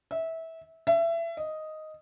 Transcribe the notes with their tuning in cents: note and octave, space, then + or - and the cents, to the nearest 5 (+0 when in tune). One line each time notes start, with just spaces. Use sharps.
E5 -20
E5 +25
D#5 +0